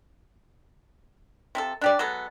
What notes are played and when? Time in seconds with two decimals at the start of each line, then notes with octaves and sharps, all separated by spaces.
1.55 C3 F3 A4
1.81 D4 G4 D5
1.99 F#3 G#3 B3 A4